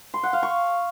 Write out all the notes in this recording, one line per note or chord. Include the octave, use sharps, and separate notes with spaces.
C6
F#5
F5
C#6